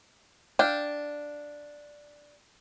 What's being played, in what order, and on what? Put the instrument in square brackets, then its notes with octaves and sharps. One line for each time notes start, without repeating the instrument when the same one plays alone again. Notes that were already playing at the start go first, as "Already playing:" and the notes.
[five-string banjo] D4 F5 G5